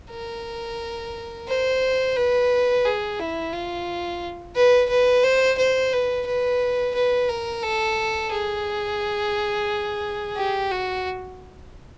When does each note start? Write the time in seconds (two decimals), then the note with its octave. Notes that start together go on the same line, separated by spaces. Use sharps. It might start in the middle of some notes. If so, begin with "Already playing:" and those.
0.11 A#4
1.48 C5
2.16 B4
2.85 G#4
3.19 E4
3.53 F4
4.55 B4
4.89 B4
5.23 C5
5.58 C5
5.93 B4
6.26 B4
6.95 B4
7.29 A#4
7.63 A4
8.32 G#4
10.36 G4
10.71 F#4